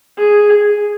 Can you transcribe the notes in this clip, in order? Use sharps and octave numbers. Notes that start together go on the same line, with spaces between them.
G#4